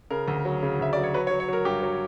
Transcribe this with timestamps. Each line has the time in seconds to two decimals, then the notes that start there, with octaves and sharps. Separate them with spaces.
0.10 C#3 A#4
0.28 D2
0.45 F#3
0.62 C#3
0.79 D2 E5
0.93 F#3 D5
1.03 C#5
1.14 F#3 B4
1.27 C#5
1.31 F#3
1.40 C#5
1.48 F#3 A#4
1.65 G2 G4
1.83 F#3